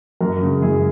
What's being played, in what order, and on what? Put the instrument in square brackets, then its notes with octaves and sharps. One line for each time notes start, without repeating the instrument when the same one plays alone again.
[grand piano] F#2 F#4 A#4
C#3 G#3
F#2 E4 G#4